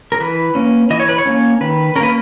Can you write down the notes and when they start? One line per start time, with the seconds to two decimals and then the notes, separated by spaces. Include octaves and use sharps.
0.12 A#4
0.20 E3 B4
0.55 A#3 C#4
0.90 E3 D#5
1.00 C#5
1.09 B4
1.18 C#5
1.26 A#3 C#4
1.61 D#3 B4
1.95 C#4 A#4
2.00 A#3 B4